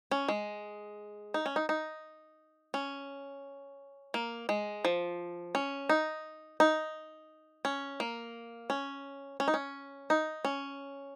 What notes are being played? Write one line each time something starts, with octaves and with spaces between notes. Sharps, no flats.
C#4
G#3
D#4
C#4
D#4
D#4
C#4
A#3
G#3
F3
C#4
D#4
D#4
C#4
A#3
C#4
C#4
D#4
C#4
D#4
C#4